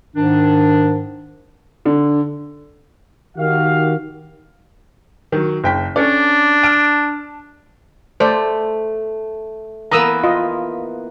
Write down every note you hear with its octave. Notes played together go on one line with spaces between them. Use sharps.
G#2 D#3 D4
D3
D#3 F#4 G4 F5
D#3 F#3
F#1 G5 B6
C#4 D4 A4 D5
A5 F6 D7
A3 C5 D5
E3 A#3 B3 A#5 D#6 E6
F4 D#5